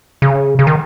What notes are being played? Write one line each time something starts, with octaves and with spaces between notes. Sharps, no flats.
C#3
C#3
D#3